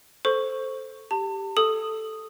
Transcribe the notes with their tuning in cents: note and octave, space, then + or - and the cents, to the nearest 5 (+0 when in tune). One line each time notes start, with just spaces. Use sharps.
A4 +0 C5 +0 C#6 +0
G4 +0 A5 +30
A4 +0 D#6 -5